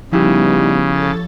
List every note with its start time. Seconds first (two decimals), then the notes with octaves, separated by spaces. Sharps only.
0.11 C#3 F3 G3 B3 D#4 E4 G4
0.89 A4 C#5 A6